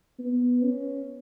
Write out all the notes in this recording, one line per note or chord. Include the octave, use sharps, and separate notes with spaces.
B3
C#4